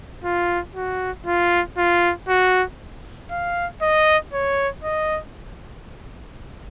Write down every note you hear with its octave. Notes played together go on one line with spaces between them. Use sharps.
F4
F#4
F4
F4
F#4
F5
D#5
C#5
D#5